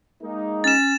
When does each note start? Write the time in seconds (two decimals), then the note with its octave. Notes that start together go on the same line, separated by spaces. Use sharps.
0.23 G#3 A#3 D#4
0.64 C#4 A6 E7